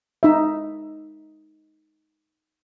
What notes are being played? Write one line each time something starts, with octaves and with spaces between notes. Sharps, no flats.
D#4 E5